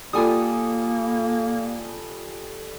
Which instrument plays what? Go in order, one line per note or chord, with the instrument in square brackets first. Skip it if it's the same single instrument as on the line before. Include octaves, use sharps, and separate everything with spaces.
[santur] G3 A4 [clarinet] A#3 [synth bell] F4 G#5 D#6